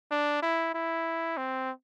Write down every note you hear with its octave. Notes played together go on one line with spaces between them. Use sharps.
D4
E4
E4
C4